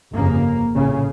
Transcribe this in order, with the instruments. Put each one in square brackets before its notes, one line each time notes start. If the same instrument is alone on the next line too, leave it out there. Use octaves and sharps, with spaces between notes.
[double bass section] G1 F2 C#3 A#3
A#1 A2 C#3